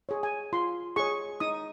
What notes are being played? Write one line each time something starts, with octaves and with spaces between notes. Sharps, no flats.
G#4 C#5
G#5
F4 C6
G#4 C#5 C#6
D#4 D#6